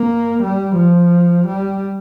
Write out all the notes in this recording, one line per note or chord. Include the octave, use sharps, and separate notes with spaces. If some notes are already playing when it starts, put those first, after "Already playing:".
Already playing: A#3
G3
F3
G3